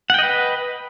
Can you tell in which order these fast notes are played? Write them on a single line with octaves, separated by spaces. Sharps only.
F#5 G5 D#5 B4